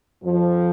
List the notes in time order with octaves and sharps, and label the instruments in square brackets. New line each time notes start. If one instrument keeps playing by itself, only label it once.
[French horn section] F2 F3